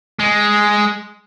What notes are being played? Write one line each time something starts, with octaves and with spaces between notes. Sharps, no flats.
G#3